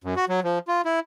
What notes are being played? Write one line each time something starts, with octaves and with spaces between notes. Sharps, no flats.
F#2
F#4
F#3
F3
F4
E4